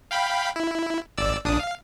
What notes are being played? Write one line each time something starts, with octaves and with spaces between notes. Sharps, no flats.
F5 G5 B5
E4
G#1 D5 E6
A#1 D4 D#6
F5